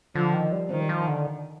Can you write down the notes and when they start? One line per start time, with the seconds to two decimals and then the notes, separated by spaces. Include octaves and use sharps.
0.15 D3 F3
0.34 D#3
0.52 G3
0.70 D#3 F3
0.80 G3
0.89 F3
1.08 D3